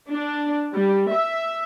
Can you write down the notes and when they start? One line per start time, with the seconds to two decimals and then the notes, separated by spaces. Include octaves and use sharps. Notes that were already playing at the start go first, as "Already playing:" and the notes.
0.11 D4
0.74 G3
1.12 E5